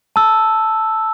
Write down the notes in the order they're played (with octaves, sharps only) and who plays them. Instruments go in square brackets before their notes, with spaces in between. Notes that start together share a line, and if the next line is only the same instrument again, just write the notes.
[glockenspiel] A5 E6